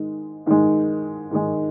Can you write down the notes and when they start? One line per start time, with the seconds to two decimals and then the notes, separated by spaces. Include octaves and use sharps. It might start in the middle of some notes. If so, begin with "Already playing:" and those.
Already playing: G#2 D#3 G#3
0.46 G#2 D#3 G#3
1.31 G#2 D#3 G#3